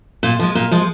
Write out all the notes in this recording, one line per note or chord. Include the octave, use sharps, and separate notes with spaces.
A#2
F3 G#3
A#2
F3 G#3